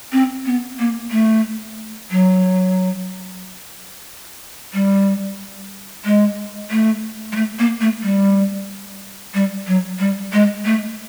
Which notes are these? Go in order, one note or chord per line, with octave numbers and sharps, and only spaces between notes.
C4
B3
A#3
A3
F#3
G3
G#3
A3
G#3
A3
A#3
A3
G3
G3
F#3
G3
G#3
A3